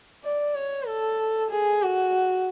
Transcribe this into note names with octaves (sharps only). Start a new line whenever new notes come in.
D5
C#5
A4
G#4
F#4